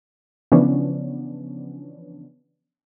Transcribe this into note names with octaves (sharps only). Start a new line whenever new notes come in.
C#3 E3 F3 B3 C#4 D4